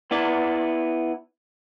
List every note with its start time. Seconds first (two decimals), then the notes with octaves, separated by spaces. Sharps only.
0.11 B3 E4 D5